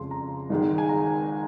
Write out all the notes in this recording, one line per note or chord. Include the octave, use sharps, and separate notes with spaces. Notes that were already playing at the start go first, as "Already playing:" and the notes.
Already playing: F2 C#3 G#3 C6
A#5
G#1 G#2 D#3 G#3
G#5
A#5